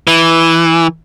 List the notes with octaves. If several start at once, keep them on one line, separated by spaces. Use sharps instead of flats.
E3